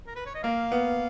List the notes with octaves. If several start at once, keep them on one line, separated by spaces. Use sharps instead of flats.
A#4
B4
C#5
D#5
A#3 F5
B3